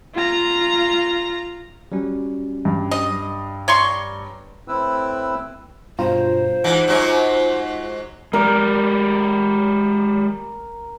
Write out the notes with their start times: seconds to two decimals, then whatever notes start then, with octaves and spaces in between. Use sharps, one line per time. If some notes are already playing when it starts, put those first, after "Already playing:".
0.14 F4 A#5
1.92 F#3 G3 C#4
2.65 G2
2.91 D#5
3.68 C#5 D5 A#5 C6 C#6
4.68 A2 C4 E4 B4 E6
5.99 G2 B2 F4 C5 A#5
6.64 E3 G#3 D#4 F#5
6.88 G#2 F#3 F#4
8.33 G#3 G4 A#4 D5